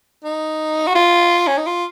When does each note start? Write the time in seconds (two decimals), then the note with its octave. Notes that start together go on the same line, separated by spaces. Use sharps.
0.24 D#4
0.87 F#4
0.95 F4
1.47 C#4
1.58 D#4
1.67 F4